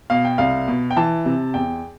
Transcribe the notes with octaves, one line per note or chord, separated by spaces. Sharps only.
B2 F5
G5
C2 F5
B2
G5
E3 A5
C3
E2 G5